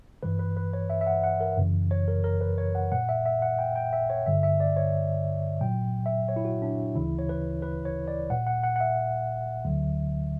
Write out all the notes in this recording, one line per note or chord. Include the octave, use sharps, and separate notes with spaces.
G2 E3 G3 B4
B4
B4
C#5
E5
E5
F#5
F#5
A#4
F#2 C#3 E3
C#5
A#4
A#4
B4
C#5
F#5
A#2 G3 F#5
E5
E5
F#5
G5
G5
E5
C#5
G2 D3 G3 E5
E5
D5
C#5
A#2 F#3 G5
E5
C#5
E4
F#4
D4
D2 C#3 E3 G3 E4
C#5
B4
B4
C#5
D5
A#2 G3 F#5
F#5
F#5
F#5
E5
D2 D3 F#3